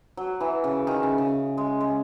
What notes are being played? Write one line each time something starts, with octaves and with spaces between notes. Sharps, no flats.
F#3
E3
C#3
D#3
C#3
C#3
G#3
G#3